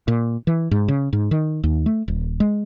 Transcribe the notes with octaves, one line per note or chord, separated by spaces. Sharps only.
A#2
E3
G#2
C#3
G#2
D#3
D#2
A3
D#1
G#3